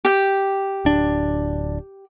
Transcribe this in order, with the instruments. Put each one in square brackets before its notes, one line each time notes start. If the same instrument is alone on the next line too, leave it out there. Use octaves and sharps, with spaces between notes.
[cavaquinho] G4 G5
[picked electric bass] D1 D4